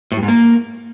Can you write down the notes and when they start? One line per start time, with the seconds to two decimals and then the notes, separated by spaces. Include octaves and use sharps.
0.12 A2
0.17 G2
0.23 G#2
0.28 A#3